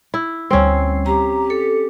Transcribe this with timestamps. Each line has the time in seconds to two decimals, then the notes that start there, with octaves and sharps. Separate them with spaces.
0.14 E4
0.50 D2 G3 C4 C#4 C7
1.06 G4 A#5
1.50 A4 C#7